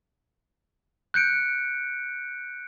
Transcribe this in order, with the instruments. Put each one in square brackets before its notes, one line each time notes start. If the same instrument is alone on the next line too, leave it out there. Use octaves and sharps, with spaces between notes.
[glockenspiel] F#6 G6 C#7 D7